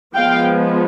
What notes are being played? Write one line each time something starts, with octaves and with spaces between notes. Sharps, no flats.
F3 G#3 B3 F5 G5